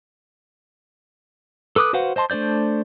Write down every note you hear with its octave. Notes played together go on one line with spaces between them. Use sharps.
A4 B4 D6 D#6 F#6
F#4 B4 C5 F5 F#5
C5 D#5 A5 C6
A3 D4 C5 D5 G6